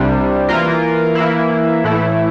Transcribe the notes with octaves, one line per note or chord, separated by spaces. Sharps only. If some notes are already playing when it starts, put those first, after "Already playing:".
Already playing: C2 C3 G3 D4
E3 A#3 F4 A#4
E3 A#3 E4
A2 E3 A3 E4